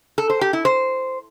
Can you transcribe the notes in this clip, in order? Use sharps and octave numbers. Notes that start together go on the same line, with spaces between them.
A4
C5
G4
E4
C5